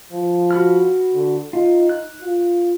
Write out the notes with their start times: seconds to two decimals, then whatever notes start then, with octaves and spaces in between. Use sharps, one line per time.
0.12 F3
0.51 F#4 B5 F6
1.13 D3
1.53 D#4 F4
1.89 F#6
2.21 F4